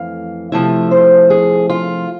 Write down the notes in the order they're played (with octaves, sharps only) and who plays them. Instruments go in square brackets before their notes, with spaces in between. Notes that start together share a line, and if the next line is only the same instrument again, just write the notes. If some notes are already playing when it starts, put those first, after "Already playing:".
Already playing: [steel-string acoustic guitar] F2 E3 A3 F5
C3 F3 A3 E4 E5
C5
G#4
F4